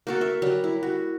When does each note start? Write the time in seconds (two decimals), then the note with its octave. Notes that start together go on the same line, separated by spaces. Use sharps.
0.07 A#3 F#4 A4
0.21 E5
0.42 F#3 G3
0.64 E4
0.83 F#4